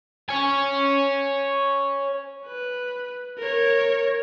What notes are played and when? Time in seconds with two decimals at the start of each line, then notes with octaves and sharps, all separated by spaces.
0.29 C#5 G#5
2.46 B4
3.39 A#4 C#5